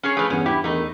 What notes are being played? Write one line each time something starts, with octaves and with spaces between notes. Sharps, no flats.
C#4 G#4 C#5
F3 A3 G#4 B4 F6
E2 G2 B3 C#4
E4 G4
E2 D#3 A3 D#4